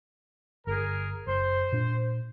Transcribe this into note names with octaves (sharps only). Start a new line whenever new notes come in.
G1 G#4 A#4
F#1 C5
A#2 D4